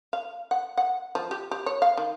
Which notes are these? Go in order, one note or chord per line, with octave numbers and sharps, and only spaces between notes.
F5
F#5
F#5
F3
G4
G4
C#5
F5
D#3